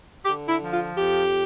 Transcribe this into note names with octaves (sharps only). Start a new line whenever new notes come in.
D3 G4
E4
F3
F4
F2 G4